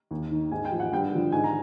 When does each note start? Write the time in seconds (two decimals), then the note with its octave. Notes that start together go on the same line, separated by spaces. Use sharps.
0.11 D#2
0.31 D#3
0.51 G#2 G#5
0.65 G5
0.72 F3
0.80 F#5
0.92 G2 G5
1.11 D3 F3
1.32 G#2 G#5
1.44 A#5